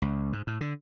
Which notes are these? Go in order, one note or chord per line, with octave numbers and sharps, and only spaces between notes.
C#2
G#2
A2
D3